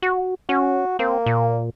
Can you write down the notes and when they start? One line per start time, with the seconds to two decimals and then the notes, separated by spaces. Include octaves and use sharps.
0.02 F#4
0.49 C#4 F#4
0.99 A#3 C4
1.26 A#2